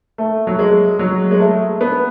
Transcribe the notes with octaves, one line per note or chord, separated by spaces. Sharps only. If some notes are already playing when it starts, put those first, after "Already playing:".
A3
F#3
G#3
F#3
G#3
A3
B3